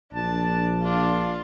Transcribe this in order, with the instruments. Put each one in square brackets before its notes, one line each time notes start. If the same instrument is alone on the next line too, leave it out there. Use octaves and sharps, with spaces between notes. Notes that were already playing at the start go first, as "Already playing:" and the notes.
[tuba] A#1 [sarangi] D4 [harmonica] A5
[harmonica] D4 [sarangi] F4